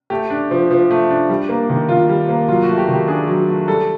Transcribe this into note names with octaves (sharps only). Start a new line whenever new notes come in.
A3 G4
D4
F3
F3
A3
D4
G3
A#3
D#3
D#3 F4
G3
A#3
F#3 F4
F#4
A3
G4
D#3
G4
D4 G#4
F#3
A3
G3 A4